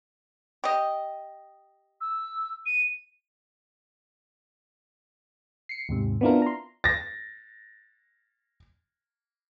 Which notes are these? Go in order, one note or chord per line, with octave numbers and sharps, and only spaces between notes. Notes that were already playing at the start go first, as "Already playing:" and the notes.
G4 D#5
E6
D#7
C7 C#7
D#2 G#2 C3
B3 C4 D4 E4 F4 A#4
A#5 C6
A6 A#6